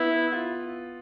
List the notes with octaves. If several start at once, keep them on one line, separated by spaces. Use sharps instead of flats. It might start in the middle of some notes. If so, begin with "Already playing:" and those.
Already playing: B3 E4
F4